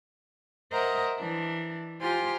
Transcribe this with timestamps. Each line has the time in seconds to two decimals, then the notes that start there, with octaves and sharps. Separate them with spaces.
0.72 A#4 C5 D#5 E5 F#5 A#5
1.19 E3 D4
2.01 F4 G4 C5 G#5 A#5 C6